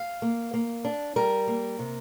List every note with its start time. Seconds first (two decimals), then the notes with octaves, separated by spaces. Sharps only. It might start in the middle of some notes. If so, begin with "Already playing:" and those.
Already playing: F5
0.22 A#3
0.54 A#3
0.85 D4
1.16 G3 A#4
1.48 A#3
1.79 C3